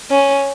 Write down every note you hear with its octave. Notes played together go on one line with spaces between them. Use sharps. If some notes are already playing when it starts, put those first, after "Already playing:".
C#4